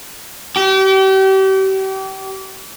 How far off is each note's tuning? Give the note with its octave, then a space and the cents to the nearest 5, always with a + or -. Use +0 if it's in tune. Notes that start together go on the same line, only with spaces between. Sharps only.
G4 -35